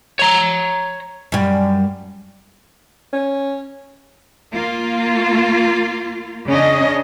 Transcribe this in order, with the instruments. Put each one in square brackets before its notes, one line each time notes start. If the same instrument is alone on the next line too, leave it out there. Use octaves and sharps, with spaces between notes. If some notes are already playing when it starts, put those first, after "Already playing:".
[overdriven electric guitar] C#5 A#5
[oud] F#2 G3
[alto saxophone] C#4
[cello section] A#3 F4
C#3 C#4 D4 D#5